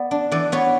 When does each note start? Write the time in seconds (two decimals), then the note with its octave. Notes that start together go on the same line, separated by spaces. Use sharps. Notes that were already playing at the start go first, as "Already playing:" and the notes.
Already playing: B3 D5
0.11 D4
0.31 E3 D5
0.52 B3 C#5